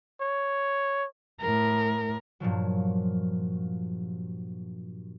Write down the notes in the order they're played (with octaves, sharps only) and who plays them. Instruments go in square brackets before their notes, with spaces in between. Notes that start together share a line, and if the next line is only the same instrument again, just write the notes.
[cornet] C#5
[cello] A2 A#4
[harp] G2 A#2 F3 F#3